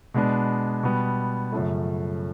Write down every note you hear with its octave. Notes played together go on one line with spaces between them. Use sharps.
B2 G#3 B3 D4
B2 G3 B3
F#2 C#3 F3 A3